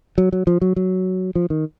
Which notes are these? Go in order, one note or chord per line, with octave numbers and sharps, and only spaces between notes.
F#3
F#3
F3
F#3
F#3
F3
D#3